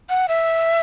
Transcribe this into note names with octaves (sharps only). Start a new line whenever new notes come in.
F#5
E5